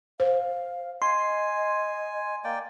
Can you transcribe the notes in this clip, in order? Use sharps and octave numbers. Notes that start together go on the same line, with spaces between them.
C5 F5
D#5 G#5 C6
A#3 D5 G5